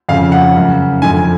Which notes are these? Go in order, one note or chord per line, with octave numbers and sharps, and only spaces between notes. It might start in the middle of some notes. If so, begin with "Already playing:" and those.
F2 C#3 F5
F#5
F#2 C#3
F2 D3 G#5